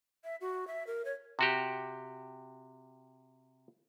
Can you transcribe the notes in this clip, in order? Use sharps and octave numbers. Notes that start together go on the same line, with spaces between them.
E5
F#4
E5
A#4
C#5
C3 F#4 G4